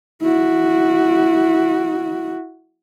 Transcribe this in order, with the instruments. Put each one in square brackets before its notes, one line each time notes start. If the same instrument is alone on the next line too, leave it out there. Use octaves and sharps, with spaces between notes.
[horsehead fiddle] E4 F#4